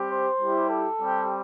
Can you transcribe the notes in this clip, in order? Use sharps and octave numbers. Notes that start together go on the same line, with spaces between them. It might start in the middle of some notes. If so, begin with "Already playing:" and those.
Already playing: G3 C4 G4
C5
G3 E4 G4
A4
G3 C4 G4